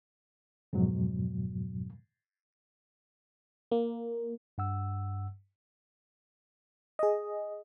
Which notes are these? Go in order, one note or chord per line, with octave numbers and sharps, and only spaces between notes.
F2 G#2 B2 F#3
A#3
G2 F#5 E6
G#4 D#5